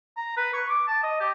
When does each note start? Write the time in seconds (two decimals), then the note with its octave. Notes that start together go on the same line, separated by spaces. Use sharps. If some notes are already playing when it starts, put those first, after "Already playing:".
0.17 A#5
0.37 B4
0.53 C#6
0.69 D6
0.87 A5
1.03 D#5
1.20 G4